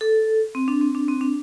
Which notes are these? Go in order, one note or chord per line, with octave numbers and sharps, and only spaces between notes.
A4
C4
D4
C4
D4
C4
D4